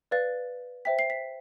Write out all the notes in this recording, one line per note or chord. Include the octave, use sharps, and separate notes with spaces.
B4 D5 F5 A6
C5 E5 G5 B6
C7
B6